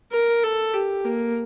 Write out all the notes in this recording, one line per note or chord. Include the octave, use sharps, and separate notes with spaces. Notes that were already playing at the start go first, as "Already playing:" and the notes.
A#4
A4
G4
A#3